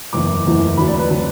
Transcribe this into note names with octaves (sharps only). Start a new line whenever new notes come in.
F#1 E2 E3 D6
F#1 E2 E3
D2 D3 F#3 B5
D5
B4
D3 F#3 B4